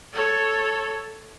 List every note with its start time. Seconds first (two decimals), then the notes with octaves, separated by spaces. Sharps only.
0.13 A4 C#5